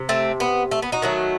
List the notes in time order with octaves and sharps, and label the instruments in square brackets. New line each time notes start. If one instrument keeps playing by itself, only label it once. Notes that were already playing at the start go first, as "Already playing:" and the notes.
Already playing: [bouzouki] C3
A3 C4
B3
A3
B3
D#4 F#4
D#3 F#3 A3